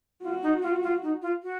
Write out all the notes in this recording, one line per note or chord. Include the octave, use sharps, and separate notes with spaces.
F4 F#4
D#4
F4
F4
D#4
F4
F#4